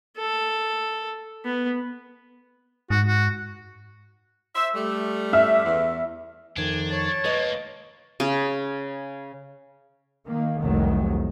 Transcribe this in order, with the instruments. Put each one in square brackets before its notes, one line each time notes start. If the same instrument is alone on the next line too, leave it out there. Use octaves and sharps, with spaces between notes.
[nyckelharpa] A4
B3
[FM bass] G#2 [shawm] F#4
[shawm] F#4
[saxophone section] C5 E5
G3 A3
[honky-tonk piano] E5 F6
[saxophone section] E2
[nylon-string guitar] F2 D#3 [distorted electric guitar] D4 [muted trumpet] G#5
[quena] C#5 [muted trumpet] A5
[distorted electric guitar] G#3 A#3 [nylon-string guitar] B4 D#5
[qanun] C#3
[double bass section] D#3 A#3
F1 C2 D#3 F#3